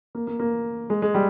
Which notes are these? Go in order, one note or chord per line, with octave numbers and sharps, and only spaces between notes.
A#3
A#3
A#3
G#3
G#3
G3